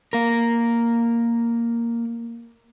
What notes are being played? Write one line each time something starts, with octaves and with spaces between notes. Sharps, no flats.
A#3 A#4